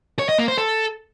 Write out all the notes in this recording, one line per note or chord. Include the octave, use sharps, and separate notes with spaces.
C#5
D#5
A#3
C5
A4